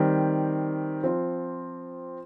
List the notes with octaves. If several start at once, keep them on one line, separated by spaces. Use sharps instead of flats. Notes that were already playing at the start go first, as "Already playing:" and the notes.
Already playing: D#3 G3 C4 G4
F3 C4 F4